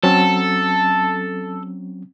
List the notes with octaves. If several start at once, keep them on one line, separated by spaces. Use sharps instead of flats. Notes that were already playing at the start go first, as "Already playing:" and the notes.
F#3 C4 C#4 A4